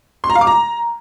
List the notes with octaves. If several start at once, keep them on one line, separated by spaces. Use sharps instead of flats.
C6
A#5
F5
D6
A#5